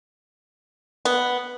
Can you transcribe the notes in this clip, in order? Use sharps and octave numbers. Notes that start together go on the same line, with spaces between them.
B3